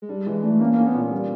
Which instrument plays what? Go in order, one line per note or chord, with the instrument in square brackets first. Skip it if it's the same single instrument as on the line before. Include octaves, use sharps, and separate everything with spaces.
[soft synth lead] G#3
[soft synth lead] G3 [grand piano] D4
[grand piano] E3 [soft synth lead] G#3
[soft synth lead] A3 [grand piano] D4
[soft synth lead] A#3 [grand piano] C#4
[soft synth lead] A#3 [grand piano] C#4
[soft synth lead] B3
[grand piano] A#2
G3